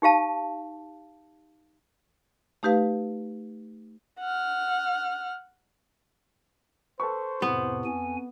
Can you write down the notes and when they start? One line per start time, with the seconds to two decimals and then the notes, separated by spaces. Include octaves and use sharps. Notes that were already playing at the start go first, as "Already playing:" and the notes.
0.02 D#4 G4 F5 A5
2.63 A3 D#4 G4 B4 F5
4.20 F#5 F6
7.00 A4 B4 C5 C#6
7.42 F2 A2 C3 B3
7.85 F2 G#5